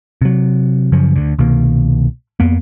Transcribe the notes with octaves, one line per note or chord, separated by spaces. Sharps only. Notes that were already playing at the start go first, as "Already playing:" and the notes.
C3 F#3
F#2 C#3 F3 F#3
D2 D3
C2 B2 D#3 A#3
F2 A#3 B3